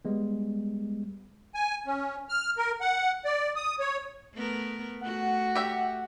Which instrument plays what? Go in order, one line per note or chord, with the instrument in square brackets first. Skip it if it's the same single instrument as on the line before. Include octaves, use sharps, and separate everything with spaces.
[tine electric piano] G3 G#3 B3
[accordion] G#5
C#4
F6
A#4
F#5
D5
D#6
C#5
[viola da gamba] A3 B3 A#4
[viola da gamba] A3 F#4 [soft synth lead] F#5
[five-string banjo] G4 E5 G5